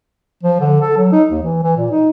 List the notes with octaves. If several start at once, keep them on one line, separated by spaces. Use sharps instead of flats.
F3
D3
A4
F#3
D#4
D#2
E3
E3
A#2
D#4